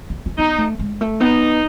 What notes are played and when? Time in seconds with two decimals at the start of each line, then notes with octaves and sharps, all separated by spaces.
0.10 B3
0.26 C#4
0.38 B3 D#4
0.58 A3
0.79 G#3
1.01 A3
1.21 B3 D#4